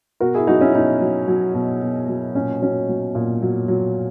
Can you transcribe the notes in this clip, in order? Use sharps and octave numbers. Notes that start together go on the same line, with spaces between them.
B2 F#4 A#4
E4 G#4
F#3 D#4 F#4
C#4 E4
B2 D#4
F#3
F#3
B2
B2
F#3
A#2 C#4
F#3 C#4
F#3
A#2
F#3
F#3